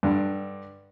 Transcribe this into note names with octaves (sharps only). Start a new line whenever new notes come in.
G2 D3